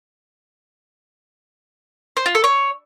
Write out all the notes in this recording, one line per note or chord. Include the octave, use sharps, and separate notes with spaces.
C5
F4
A4
C#5